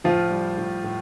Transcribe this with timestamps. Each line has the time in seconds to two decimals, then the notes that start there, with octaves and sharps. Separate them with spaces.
0.04 A2 F3 F4
0.31 G3
0.58 A2
0.84 A2